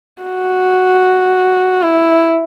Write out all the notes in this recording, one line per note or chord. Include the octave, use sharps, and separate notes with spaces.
F#4
E4